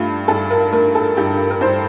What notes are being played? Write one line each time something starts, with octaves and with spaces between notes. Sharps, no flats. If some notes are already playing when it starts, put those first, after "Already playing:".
Already playing: G2 A3 F4
G2 A4
A#4
A3 A#4
A4
G2 G4
A#4
G2 C5